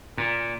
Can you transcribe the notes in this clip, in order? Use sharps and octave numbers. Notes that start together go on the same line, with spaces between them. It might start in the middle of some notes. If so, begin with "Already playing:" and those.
A#2